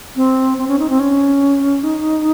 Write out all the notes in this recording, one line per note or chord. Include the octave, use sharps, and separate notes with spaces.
C4
C4
C#4
D#4
C4
C#4
D#4